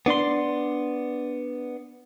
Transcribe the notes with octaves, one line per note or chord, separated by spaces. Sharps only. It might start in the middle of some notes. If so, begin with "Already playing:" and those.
B3 D4 D5 C6